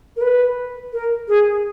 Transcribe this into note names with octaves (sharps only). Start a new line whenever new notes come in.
A#4
B4
A#4
G#4